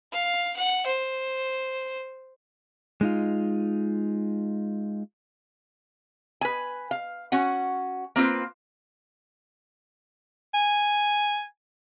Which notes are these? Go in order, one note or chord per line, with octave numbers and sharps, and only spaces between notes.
F5
F#5
C5
G#3 D#4 F4
B4 G#5
F5
C#4 F#4 F#5
A#3 C4 F4 B4
G#5